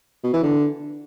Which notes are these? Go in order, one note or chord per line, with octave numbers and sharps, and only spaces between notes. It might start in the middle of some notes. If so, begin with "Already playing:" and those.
B2
E3
D3